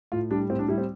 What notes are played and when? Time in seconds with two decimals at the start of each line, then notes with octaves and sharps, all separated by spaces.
0.12 A2 F4
0.31 G3 D4
0.49 A2 C4
0.59 D4
0.68 G3 E4
0.78 C4